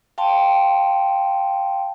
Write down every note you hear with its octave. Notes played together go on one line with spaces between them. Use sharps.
F5 G5 A5 C6